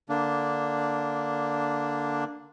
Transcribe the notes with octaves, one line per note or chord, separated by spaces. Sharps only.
D3 A#3 D4